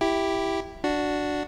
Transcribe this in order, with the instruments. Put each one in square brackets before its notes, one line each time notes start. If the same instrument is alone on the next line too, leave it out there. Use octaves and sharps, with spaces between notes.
[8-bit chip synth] E4 G4
D4 F#4